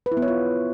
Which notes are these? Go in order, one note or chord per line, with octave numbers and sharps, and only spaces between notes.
B4
E4
B3
C#5
F4